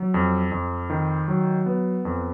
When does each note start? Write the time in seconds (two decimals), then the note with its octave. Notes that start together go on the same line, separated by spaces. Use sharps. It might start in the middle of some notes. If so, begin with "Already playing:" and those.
Already playing: F#3
0.14 F2
0.52 F2
0.90 D#3
1.28 F#3
1.66 B3
2.05 F2